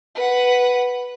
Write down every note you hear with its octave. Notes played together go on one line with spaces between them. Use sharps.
B4 F#5